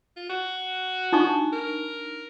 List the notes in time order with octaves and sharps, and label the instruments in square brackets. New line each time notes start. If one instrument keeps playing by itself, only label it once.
[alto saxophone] F4
F#4
[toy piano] D4 D#4 C#6
[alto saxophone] A#4